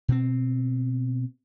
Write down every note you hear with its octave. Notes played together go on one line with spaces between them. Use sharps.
B2 C4